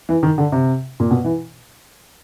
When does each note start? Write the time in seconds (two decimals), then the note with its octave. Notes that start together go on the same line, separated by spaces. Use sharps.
0.09 E3
0.23 D#3
0.38 D3
0.52 C3
1.00 A#2
1.11 B2
1.25 E3